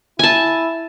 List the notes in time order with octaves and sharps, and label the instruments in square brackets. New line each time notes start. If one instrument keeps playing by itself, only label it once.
[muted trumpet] E4 [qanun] G#5 A5